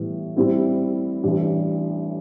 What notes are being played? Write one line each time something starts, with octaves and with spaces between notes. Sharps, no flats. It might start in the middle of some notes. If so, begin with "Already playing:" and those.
Already playing: A2 E3 G3 B3
A2 G3 C4 E4
A1 A2 G3 D4